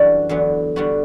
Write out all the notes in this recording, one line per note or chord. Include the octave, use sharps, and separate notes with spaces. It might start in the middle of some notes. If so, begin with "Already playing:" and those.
Already playing: F#2 E3 G3 D4 F#4 A4
E2 D3 F#3 B3
D3 G3 B3 F#4